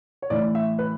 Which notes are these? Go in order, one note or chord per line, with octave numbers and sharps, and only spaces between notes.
C#5
A2 E3 D5
E5
B4